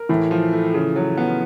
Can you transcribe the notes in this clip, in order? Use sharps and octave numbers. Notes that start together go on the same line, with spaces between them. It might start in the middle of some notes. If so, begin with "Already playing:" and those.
Already playing: A#4
A2 E3
F3
A3
C#3
F#3
B3